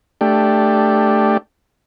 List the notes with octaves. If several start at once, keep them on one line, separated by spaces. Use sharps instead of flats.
A3 D4 G4